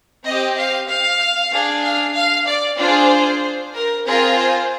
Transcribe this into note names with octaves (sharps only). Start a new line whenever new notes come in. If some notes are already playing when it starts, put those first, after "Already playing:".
C4 G4 D#5
F5
F5
D4 G#4
F5
F5
D5
D4 F4 G#4 C5
A#4
C4 F4 G#4 A#4
C5